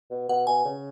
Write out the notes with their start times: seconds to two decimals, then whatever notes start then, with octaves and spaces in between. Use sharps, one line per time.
0.10 B2
0.29 B2 F#5
0.47 B2 G#5
0.65 C#3